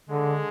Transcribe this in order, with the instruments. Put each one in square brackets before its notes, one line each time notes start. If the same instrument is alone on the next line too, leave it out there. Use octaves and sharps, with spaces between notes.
[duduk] D3 [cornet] G#3